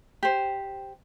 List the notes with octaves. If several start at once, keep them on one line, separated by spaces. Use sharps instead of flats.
G4 C5